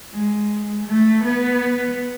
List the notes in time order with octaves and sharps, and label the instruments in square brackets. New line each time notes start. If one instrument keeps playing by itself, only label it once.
[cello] G#3
A3
B3